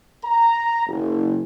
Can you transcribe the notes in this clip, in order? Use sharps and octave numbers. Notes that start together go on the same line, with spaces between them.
A#5
F#1